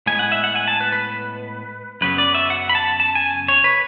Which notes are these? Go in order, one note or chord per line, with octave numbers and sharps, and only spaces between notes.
A2 G#3 B3 G#5
F#5
E5
F#5
G#5
A5
B4
B4
F#2 C#3 F#3 B3 B4
D5
E5
F#5
B5
A5
A5
G#5
C#5
B4